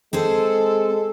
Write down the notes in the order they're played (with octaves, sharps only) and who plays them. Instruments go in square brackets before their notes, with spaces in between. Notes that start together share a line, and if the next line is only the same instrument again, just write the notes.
[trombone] G#3 [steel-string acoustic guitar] C4 G#4 C5 [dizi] A4